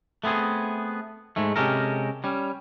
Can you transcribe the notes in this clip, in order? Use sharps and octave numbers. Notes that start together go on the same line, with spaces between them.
A3 B3 C4 G#4
G#2 G#3 A3
C3 G#3 C#4 G4 A4 A#4
G3 C#4